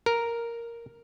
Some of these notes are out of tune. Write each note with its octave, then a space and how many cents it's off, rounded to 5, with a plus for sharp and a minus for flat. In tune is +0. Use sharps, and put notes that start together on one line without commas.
A#4 +0